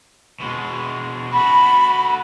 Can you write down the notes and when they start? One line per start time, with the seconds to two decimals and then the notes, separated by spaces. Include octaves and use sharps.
0.40 B2 G#3
1.32 F#4 A4 B5